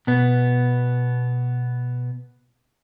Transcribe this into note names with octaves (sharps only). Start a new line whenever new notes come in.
B2 B3